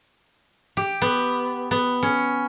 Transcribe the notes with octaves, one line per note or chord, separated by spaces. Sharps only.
G4
B3
B3
C#4